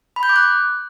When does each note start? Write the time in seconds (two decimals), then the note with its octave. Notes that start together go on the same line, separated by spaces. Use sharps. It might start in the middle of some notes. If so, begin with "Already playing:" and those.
0.16 B5
0.23 G6
0.29 D6
0.36 F#6